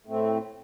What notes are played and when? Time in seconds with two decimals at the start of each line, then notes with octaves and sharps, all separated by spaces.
0.06 A2 A3 C4